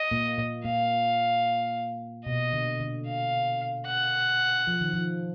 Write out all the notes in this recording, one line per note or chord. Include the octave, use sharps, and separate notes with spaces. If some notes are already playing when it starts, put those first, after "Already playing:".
Already playing: D#5
A#2 A#3
A#2 A#3
A#2 A#3 F5
B2 D#5
D3
D3
F5
F#5
F3
D#3
F3